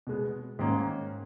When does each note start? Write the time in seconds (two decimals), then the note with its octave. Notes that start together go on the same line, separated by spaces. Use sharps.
0.07 B2 G#3 B3
0.59 G#2 D#3 A#3 C#4